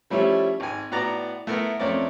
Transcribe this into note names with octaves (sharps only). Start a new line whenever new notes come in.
F3 G3 A3 C#4 E4
G#1 G#5
A2 B3 F#4 D5 A#5
A3 B3 E4 A#4
F2 A3 C#4 A#4 D5